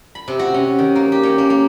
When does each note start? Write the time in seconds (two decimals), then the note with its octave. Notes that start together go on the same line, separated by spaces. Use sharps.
0.15 B5
0.28 C3
0.39 F#4
0.54 C#4
0.79 D#3
0.95 A#3
1.12 G4
1.23 C#4
1.38 A#3
1.50 A#3